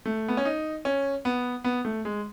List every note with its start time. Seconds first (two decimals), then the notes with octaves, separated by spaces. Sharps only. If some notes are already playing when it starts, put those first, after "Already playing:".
0.06 A3
0.28 B3
0.37 C#4
0.45 D#4
0.85 C#4
1.25 B3
1.64 B3
1.85 A3
2.05 G#3